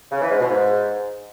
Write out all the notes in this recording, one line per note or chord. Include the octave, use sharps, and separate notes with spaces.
C#3
E3
G#2
B2
G#2